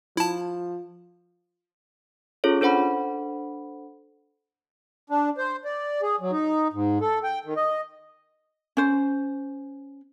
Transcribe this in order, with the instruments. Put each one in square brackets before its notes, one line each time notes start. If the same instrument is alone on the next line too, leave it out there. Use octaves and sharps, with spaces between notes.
[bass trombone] F3 [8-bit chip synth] E4 A5
[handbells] C#4 F4 G#4 A4 C#5
D4 A4 C5 F#5 B5
[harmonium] D4
C5
D5
G#4
F#3
D#4
G#2
A4
G5
D#3
D#5
[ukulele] C#4 C5